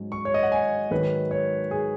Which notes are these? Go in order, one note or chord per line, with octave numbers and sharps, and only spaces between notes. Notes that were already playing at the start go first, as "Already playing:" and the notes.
Already playing: G#2 F#3 C#4
C#6
C#5
D#5
F#5
G#5
G#2 D#3 F#3 B4
C#5
G#4